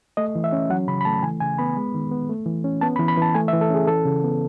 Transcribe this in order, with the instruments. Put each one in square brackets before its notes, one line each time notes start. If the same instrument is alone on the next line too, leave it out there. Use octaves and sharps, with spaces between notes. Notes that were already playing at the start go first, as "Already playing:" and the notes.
[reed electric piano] A3 D#5
E3
E5
C#4
F#3 F#5
C#3 B5
B5
A3 A5
E3 G#5
C#3 G#5
B3 B5
G#3
D#3
B3
A3
E3
C#4
B3 A5
B5
E3
B5
E3 A5
A3 G#5
E5
E3
A4
C#4 G#4
E3 A4
C#3
B3